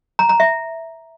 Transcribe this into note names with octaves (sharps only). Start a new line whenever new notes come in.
A#5
A#5
E5